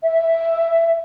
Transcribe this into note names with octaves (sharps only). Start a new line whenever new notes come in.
E5